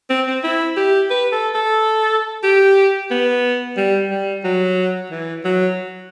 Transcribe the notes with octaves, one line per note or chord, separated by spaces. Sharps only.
C4
C4
E4
G4
B4
A4
A4
G4
B3
G3
G3
F#3
E3
F#3